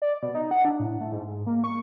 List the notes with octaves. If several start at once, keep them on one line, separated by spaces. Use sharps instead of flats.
D5
B2
D#4
F#5
D4
A2
A3
G#2
A#3
C#6